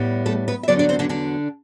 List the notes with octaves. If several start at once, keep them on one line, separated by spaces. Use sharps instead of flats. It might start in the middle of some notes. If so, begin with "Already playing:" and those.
Already playing: A2 G3 B3
A3 A4
B3 B4
E5
E2 D3 F#3 B3 D4 D5
D4 D5
C4 C5
D3 D4
D3 D4